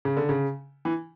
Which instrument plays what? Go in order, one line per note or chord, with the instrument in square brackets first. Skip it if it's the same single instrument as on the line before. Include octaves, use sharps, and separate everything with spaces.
[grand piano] C#3
D3
C#3
E3